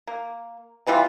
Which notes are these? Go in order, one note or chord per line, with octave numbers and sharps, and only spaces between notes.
A#3
C3 E3 G3 F4